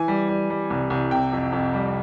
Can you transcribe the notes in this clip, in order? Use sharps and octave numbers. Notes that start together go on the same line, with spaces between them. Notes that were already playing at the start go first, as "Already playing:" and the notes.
Already playing: E3 G#5
G3
G3
G3
C2
C2
C3 G5
F2
F2
G3